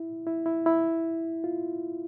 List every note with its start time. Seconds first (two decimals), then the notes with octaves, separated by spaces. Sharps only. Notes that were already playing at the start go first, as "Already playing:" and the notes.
Already playing: E4
0.27 E4
0.46 E4
0.66 E4
1.44 F4